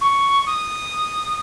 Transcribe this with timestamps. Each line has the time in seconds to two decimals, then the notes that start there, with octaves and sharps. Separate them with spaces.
0.01 C#6
0.46 D#6